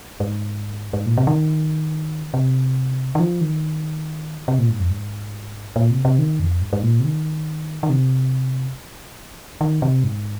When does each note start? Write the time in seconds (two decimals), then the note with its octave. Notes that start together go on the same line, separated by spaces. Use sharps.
0.20 G#2
0.93 G#2
1.06 A#2
1.18 C3
1.27 D#3
2.34 C3
3.15 D#3
3.20 F3
3.41 D#3
4.48 C3
4.59 A#2
4.70 G#2
4.80 F2
4.90 G#2
5.76 A#2
5.91 C3
6.05 C3
6.19 D#3
6.40 F2
6.62 G#2
6.73 G#2
6.83 A#2
7.00 C3
7.05 D#3
7.83 D#3
7.90 C3
9.61 D#3
9.82 C3
10.04 G#2